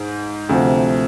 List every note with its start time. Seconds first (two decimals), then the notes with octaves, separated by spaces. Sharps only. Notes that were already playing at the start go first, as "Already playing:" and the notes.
Already playing: G#2
0.49 D2 C3 F3